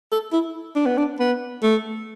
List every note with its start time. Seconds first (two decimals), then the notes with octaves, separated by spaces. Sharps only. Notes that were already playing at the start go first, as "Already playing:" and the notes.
0.12 A4
0.32 E4
0.76 D4
0.86 B3
0.97 D4
1.19 B3
1.63 A3